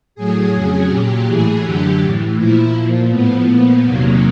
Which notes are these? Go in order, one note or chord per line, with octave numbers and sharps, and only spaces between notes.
A2 F#3 G#4
F2 C#3 F#3 G#4
A#2 F#3 G4
A2 E3 G#4
F#2 D3 F#3 G4
A2 E3
A#2 F3 E4
A#2 F3
A2 F3 B3
A#2 F3
E2 C3 D#3 F#3 A#3